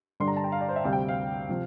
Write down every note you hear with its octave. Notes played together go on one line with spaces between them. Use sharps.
G2 D3 G3 D4 C6
A#5
A5
G5
F5
D5
C5
E5
D2 C3 G3 C4 F5
G5
F5
C3 F3